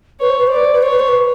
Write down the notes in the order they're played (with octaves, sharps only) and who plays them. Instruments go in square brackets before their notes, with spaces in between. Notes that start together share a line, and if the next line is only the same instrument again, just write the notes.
[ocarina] B4 [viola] C#5
[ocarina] C5
B4
C5
[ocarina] B4 [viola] D5
[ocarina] C5
B4
[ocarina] C5 [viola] C#5
[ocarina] B4
C5
B4